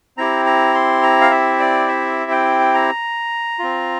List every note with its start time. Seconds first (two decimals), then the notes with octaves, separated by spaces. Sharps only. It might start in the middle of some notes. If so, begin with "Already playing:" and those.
0.17 C4 E4 G4 A#5
0.46 A#5
0.74 C6
1.03 A#5
1.21 F5
1.31 E5
1.59 D5
1.88 E5
2.31 G5
2.74 A#5
3.59 C4 F4